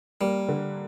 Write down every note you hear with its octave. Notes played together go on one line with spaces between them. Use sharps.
G3 A#3
D3